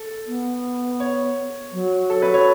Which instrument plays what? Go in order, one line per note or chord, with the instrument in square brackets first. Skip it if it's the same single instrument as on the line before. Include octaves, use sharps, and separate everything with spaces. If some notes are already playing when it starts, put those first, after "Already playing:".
Already playing: [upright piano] A4
[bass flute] B3
[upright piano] C#5
[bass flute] F#3
[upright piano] A4
B4
C#5